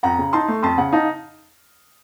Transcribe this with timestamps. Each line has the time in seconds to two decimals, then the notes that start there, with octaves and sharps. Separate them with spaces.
0.03 F2 F#5 A#5
0.18 C#3
0.33 D#4 A5 C6
0.48 A3
0.63 F2 A5 C6
0.78 C#3 F#5
0.92 D#4 F5 A5